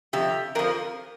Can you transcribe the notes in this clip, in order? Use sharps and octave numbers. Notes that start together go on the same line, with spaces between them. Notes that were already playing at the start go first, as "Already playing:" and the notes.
F2 C3 G4
F2 F3 A#4